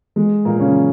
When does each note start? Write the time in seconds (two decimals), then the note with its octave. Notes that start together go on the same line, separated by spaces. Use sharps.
0.16 G#3
0.45 A#2 A#3
0.60 C#3 C#4